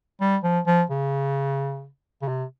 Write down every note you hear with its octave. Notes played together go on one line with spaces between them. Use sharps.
G3
F3
F3
C#3
C#3
C3